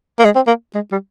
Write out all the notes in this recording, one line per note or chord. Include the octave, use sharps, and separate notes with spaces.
A#3
G#3
C4
A#3
G#3
G3